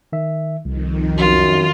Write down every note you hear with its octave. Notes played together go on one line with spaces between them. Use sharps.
D#3 E5
C2 F2 D#3
F#2 F4